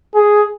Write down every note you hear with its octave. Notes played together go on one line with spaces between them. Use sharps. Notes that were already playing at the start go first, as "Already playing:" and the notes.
G#4